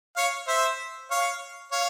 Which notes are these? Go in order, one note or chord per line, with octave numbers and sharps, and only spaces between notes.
C#5 F5
C5 E5
C#5 F5
C#5 F5